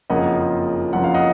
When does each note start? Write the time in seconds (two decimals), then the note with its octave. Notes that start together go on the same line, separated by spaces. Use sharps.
0.10 F#1 F2 C#3 F3 A#3 D#5 F#5
0.93 F#1 F2 C#3 F3 A#3 F#5
1.04 F5
1.14 D#5 F#5